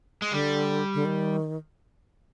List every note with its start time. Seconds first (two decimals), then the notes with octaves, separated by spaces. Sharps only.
0.22 G#3
0.31 D3 G3
0.94 D3
1.05 D#3